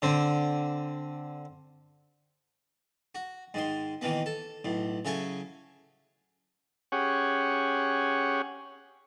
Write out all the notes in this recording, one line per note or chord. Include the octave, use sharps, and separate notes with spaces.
D3 C4
F#4
G#2 D#3 C6
B2 D#3 E3 A#3 B3
A4
B1 A2
C#3 F#3 E4 A4 G#5 C#6
C#4 G4 G#4 C#5 F#5